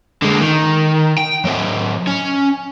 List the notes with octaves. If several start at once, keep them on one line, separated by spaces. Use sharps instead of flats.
D3 G#3
D#3
G5
F#3 C4
C#4